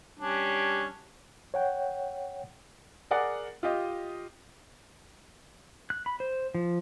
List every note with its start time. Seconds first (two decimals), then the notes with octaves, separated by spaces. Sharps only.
0.19 G3 C#4 D4
1.54 C#5 F#5 G5
3.11 G#4 A#4 D5 F#5
3.63 F4 G4 D#5
5.90 F#6
6.06 B5
6.20 C5
6.55 F3